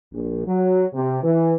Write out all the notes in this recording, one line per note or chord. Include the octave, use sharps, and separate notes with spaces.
A#1
F#3
C3
E3